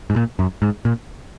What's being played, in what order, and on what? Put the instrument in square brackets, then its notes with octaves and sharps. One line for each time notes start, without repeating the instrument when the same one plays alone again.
[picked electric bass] G#2
A#2
F#2
G#2
A#2